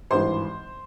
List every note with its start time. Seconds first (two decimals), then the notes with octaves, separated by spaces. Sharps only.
0.11 G#1 G2 E3 C5 C6